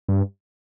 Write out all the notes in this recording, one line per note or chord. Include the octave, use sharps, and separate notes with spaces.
G2